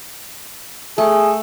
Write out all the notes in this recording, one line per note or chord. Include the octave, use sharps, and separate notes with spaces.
A3 G#4